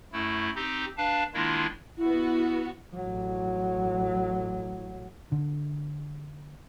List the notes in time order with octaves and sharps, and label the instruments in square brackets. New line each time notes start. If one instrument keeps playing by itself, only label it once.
[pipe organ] F#2 A3 E4
C4 D#4 G4
D4 B4 F5 A5
D#3 G#3 A#3 D4 E4 F4
[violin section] B3 F#4 [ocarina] E4
[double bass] A1 F#3
[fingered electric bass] D3